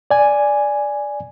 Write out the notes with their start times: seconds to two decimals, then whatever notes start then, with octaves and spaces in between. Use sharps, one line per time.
0.11 D5 G#5